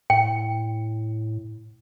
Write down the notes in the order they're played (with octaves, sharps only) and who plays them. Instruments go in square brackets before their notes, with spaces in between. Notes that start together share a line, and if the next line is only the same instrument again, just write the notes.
[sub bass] A2 [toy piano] G5